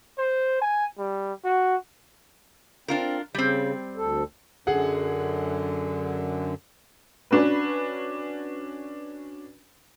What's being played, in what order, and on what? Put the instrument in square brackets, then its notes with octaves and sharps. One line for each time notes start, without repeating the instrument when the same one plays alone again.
[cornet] C5
G#5
G3
F#4
[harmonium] C4 [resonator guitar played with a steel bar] D4 F4 A#4
[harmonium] C#3 [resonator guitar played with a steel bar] G3 C4
[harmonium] D2 A4
[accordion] F#2 D3 [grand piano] G#4 F#5
[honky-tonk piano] C#4 D4 F#4 B4